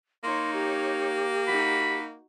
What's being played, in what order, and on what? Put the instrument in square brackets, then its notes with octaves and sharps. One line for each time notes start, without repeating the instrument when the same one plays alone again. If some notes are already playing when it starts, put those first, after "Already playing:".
[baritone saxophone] A#3 [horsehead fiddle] D#4 C#5 [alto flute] C6
[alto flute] G4
[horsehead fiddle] D#4 F#4 [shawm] B5